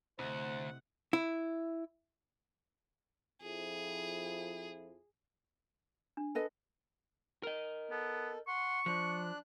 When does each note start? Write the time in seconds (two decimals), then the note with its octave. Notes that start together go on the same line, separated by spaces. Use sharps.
0.19 D2 C3 A3 E4 C5 D#5 F#5
1.13 E4
3.42 F2 F3 E4 G#4
6.17 D4
6.35 A4 B4 D#5
7.43 A#4 D#5
7.91 B3 A4
8.48 F#5 C6 C#6
8.86 F3 D4 F#6